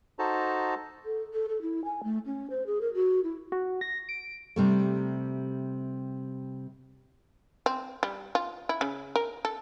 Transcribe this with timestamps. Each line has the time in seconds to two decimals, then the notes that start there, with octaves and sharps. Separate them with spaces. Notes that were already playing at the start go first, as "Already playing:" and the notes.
0.19 D#4 F#4 A4 C5 A5 A#5
1.05 A4
1.34 A4
1.49 A4
1.62 E4
1.85 G#5
2.04 A3
2.26 C#4
2.50 C5
2.67 G#4
2.81 A#4
2.94 F#4
3.24 E4
3.52 F#4
3.81 A#6
4.09 D7
4.56 C3 G3 A3
7.66 C4
8.03 G3
8.35 F4
8.69 E4
8.81 C#3
9.16 A#4
9.45 A4